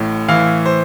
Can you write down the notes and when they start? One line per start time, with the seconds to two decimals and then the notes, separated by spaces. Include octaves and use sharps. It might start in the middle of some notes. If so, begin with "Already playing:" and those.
Already playing: A1 A2
0.28 E3 F5
0.66 C5